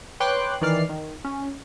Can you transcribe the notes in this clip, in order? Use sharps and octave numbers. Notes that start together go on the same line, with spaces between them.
B4 C#5 G5 C6 D6 F#6
D#3 E3 D5 F6 C7
D#3
C#4